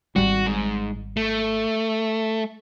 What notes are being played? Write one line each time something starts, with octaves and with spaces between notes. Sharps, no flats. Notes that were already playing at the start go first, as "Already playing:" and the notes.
G#1 C#2 G3 F#4
G#2
A3